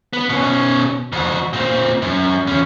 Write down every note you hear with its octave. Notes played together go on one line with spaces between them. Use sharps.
B3
B2 C#4
F2 F#4
A#2 C4
F#2
E2 C#4